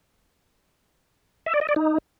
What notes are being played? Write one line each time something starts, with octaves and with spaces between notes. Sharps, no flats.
E5
D5
D#5
D5
D#4